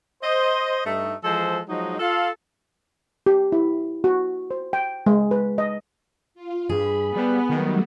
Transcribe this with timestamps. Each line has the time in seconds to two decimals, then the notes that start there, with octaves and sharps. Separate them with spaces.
0.23 C5 D#5
0.85 G2 A3 D#4
1.24 E3 F3 G#3 A4 C5 G#5
1.69 F3 F#3 G#3 D#4
1.99 F4 A4 F5
3.26 G4
3.52 E4
4.04 F#4
4.51 C5
4.73 G5
5.06 G#3
5.31 B4
5.58 D#5
6.34 F4
6.69 G2 G#4 B5
7.16 G3 B3
7.50 D#3 F#3 G3 A3